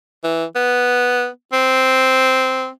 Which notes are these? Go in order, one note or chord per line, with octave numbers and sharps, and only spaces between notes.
E3
B3
C4